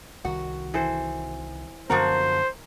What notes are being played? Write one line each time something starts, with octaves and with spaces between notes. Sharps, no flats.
C2 D#3 F#4
E3 A4 C5
F#2 D3 F3 B3 F#4 A#4 C5 A#5